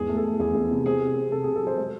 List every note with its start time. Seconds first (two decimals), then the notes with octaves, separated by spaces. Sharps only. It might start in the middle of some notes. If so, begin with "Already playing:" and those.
Already playing: E2 G#2 G#4
0.09 A3
0.17 A4
0.24 A3
0.40 E2 G#4
0.55 E2
0.71 C3
0.86 C4 G#4
1.01 C3
1.17 C4
1.31 C3 A4
1.44 G#4
1.48 C3
1.56 A4
1.63 F#3 C5
1.78 G#3 C5